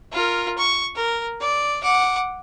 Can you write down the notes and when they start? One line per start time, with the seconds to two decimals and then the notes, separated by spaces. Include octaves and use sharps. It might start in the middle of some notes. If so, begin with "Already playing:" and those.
0.13 F4 A#4
0.58 C#6
0.96 A#4
1.41 D5
1.83 F#5 D6